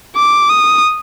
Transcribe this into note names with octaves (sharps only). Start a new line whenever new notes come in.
D6
D#6